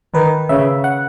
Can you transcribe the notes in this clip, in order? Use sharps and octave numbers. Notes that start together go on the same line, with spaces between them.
D#3 B4
C#3 E5
F#5